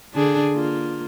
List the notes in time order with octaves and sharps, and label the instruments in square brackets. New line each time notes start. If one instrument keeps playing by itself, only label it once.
[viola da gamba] D3 D4 G#4
A#3 F4